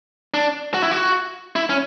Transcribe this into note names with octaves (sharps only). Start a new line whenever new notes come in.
D4
F#4
E4
F#4
E4
C#4